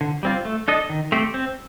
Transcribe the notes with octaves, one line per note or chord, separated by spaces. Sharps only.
D3
G3 C4 F4
A3
D4 A4 D#5
D#3
A3 C4 G4 C5
C4